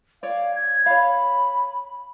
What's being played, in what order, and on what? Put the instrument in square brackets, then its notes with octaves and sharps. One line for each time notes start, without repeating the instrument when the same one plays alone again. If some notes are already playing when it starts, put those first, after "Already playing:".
[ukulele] C#5 D5 [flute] F5
[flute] G#6
[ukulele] C#5 F5 [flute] B5